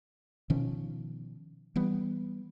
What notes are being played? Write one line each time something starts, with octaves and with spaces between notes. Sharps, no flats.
B2 D#3 F3 C#4
E3 G3 B3